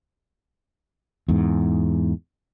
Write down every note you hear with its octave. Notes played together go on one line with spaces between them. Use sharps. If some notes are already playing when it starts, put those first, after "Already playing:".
E2 G#2